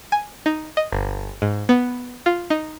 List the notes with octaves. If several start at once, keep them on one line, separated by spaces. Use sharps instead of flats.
G#5
D#4
D#5
G1
G#2
B3
F4
D#4